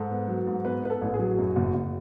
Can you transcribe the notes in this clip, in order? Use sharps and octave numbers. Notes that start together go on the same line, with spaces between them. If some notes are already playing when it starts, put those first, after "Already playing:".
Already playing: G#2 A4
B3
F#3
G#2
B3 B4
B3 B4
A4
A1
G#4
F#3
F#2 F#4
F#1
F#1